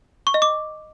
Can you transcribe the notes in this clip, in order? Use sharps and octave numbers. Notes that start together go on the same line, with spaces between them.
C#6
D#5
D6